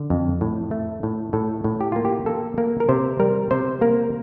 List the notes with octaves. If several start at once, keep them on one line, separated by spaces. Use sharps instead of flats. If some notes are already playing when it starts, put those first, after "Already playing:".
Already playing: D3
F2
A2
A3
A2
A2 A4
A2
G4
A#3 F4
G4
A#3 A4
A#3 A#4
A#4
C3 C5
G3 A#4
C3 C5
A#3 A#4